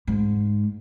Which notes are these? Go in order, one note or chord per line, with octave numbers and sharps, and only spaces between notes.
G#2